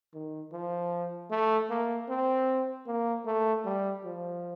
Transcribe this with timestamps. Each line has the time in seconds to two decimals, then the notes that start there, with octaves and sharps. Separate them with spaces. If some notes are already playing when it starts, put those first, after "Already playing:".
0.14 D#3
0.52 F3
1.30 A3
1.70 A#3
2.09 C4
2.86 A#3
3.26 A3
3.64 G3
4.04 F3